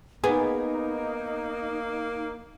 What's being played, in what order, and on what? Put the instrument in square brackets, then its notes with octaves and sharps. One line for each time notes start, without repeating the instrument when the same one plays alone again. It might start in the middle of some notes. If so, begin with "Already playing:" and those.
[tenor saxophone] A#3 [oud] B3 [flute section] D#4 [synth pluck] G#4